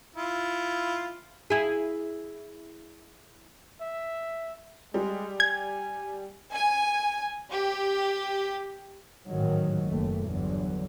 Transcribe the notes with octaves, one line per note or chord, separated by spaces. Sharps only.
E4 F4
E4 G#4
E5
G3 G#3
G#5 G#6
G#5
G4
A1 G#2 D#3 F#3
F#1 D#2 A3
G1 E2 G2 D3 F#3